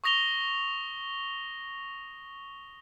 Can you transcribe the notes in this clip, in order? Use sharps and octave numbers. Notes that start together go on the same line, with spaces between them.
C#6 D#6 A#6 F7 G7